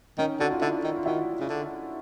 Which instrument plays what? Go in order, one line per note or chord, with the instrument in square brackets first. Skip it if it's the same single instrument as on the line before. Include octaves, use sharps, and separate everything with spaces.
[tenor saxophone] D#3 [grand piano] C#4 D#4
[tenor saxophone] D3 [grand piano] F#4
[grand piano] F4
[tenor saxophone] D3 [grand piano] D4 E4
[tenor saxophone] D#3
[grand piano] F4
[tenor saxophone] D#3 [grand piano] E4 F#4
[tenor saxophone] C#3
D3